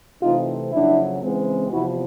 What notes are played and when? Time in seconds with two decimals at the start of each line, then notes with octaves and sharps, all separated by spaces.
0.23 C3 E3 A3 C4 D#4 F4
0.72 F2 C#3 F#3 A#3 D4 E4
1.21 C#3 E3 G#3 C4
1.70 E2 C3 F3 E4 F#4